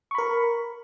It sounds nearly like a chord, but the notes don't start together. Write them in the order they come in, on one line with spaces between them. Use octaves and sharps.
C#6 B5 A#4